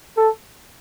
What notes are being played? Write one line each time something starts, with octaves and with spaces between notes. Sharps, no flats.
A4